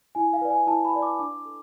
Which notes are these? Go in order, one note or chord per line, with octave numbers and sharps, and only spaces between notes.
E4 G#5
F5
B4 D5
G#5
E4 A5
B5
B4 D5
D6
D4 D6
A4